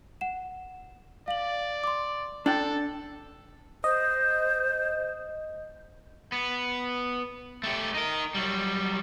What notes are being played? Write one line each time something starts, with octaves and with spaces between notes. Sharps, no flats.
F#5 E7
D5 F5 F#7
C6 D6
D4 A4 G5 A6 F#7
C5 D#5
B3
A3 G4
D#4 A#4
F#3 G3